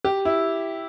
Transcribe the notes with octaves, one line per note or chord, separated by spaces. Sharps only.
G4
E4